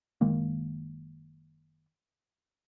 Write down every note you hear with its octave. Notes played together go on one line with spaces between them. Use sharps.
F#1 D#3 G#3 A#3